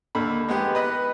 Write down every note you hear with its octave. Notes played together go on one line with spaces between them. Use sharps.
D#2 D3 B5
G#3 B3 G4
B4 D#5 B5